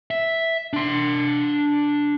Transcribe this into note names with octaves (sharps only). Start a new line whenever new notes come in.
E5
D4 C6